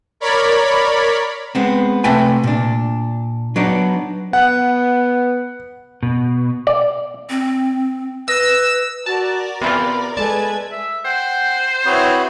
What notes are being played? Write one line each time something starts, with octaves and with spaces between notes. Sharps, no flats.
A#4 C#5 D5 B5
G#3 B3 C4
C3 A3 B4 G5 G#5
A#2 D4
F#3 B3 D4 D#4 D5
B3 F#5
B2
D5
C4
B4 D#5 E6
F#4 A#4 D5 A5
C3 E3 B3 F4 B5
G#3 A4 B4 D5 A5 G#6
E5
C5 F#5 G5
C4 E4 F#4 B4 C#5 D#6